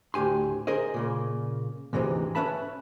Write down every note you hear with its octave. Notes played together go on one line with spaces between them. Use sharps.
D2 A2 G4 G#5 C6
G#4 A#4 C5 D#5
A#2 C#3 A#3
D2 G#2 C3 E3 G#3
C#4 F#4 B4 E5 A5 B5